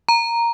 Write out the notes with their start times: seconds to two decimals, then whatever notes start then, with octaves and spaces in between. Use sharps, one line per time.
0.09 A#5